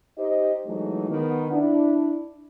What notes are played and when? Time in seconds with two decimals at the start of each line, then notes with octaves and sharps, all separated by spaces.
0.18 D#4 G4 C5 D#5
0.67 E3 F#3 G#3 A3 D#4
1.09 D#3 B3
1.52 D4 E4